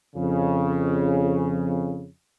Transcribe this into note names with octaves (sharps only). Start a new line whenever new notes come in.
F2 C#3